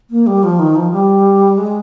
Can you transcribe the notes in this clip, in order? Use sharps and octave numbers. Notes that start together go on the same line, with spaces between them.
A#3
G3
F3
D#3
F3
G3
G#3